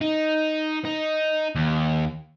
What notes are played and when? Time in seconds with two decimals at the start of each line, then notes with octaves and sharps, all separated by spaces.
0.01 D#4
0.85 D#4
1.55 D#2